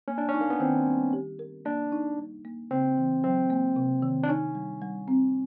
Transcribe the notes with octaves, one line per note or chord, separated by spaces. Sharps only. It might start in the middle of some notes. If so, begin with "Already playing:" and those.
A#3 C#4
D4
C#4
D#4
A#3
B3
D#3 C4
G3
G4
A#4
A#3 D4
D#4
G3
A#3
C#3 C4
E3
F#3 C4
A#3
C3
D#3
D4
C#4 D#4
G3
G3
C4